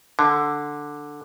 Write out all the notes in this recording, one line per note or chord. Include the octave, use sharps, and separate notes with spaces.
D3